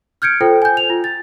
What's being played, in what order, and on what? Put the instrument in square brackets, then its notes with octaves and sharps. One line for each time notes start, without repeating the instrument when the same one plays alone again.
[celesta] F6 G6 G#6 C#7 D7
F4 A4 C5 G5
G#5 G6
F7
F4
A6